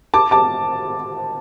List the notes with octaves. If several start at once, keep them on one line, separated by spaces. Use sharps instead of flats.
A5 D6
A5 D6